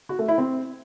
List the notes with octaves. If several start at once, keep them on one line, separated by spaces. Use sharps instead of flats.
F#4
A3
E4
C4